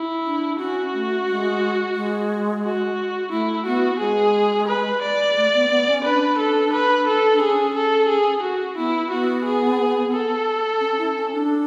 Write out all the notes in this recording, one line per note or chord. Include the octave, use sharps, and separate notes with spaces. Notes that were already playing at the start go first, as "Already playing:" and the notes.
Already playing: E4
D4
C#4 F#4
A3
G#3
G#3
F#4
A3 E4
B3 F#4
G#3 G#4
B4
D5
A3
B3
B3
C#4
D4 B4
A4
B4
A4
D4
C#4 G#4
A4
G#4
F#4
B3 E4
B3 F#4
G#4
A4
C#4
E4
C#4
D4